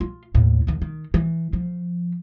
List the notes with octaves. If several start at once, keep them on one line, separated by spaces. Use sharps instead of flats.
F4
D#2 A2
D#2 D#3
D#3
E3
F3